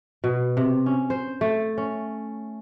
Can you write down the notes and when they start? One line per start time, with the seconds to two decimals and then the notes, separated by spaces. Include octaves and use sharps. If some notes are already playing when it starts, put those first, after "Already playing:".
0.24 B2
0.57 C3
0.86 C#4
1.10 C5
1.41 A3
1.78 C#4